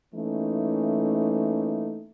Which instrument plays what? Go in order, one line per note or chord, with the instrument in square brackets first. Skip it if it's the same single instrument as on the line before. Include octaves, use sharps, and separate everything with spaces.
[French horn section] E3 A3 A#3 C#4 D#4